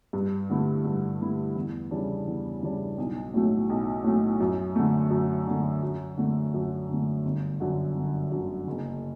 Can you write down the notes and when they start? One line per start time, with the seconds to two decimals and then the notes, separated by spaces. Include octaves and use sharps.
0.13 G2
0.50 D3 A3 E4
0.85 G2
1.20 D3 A3 E4
1.56 E2
1.91 C#3 E3 G3 D4
2.27 E2
2.63 C#3 E3 G3 D4
2.98 B1
3.34 A2 F#3 A3
3.70 B1
4.04 A2 F#3 A3
4.40 F#2
4.76 D3 A3
5.11 F#2
5.47 D3 A3
5.83 F#2
6.17 D3 A3
6.54 F#2
6.89 D3 A3
7.25 G1
7.60 F#2 D3
7.95 G1
8.32 F#2 D3
8.67 F#1